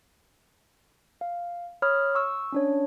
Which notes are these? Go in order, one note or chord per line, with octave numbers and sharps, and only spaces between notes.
F5
C#5 B5 D#6 F6
C#6 E6
C#4 D4 C#5